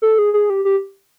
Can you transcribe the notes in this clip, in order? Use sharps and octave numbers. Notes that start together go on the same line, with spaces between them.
A4
G#4
G#4
G4
G4